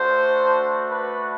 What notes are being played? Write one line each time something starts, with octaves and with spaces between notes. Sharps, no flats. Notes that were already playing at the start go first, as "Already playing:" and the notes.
Already playing: A3 D4 F#4 C5
B4